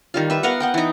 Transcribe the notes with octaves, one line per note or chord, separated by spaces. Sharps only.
D#3 G3 F4
B4 E5
B3 A#4 F5 F#5
B3 F#5 G5
E3 D#4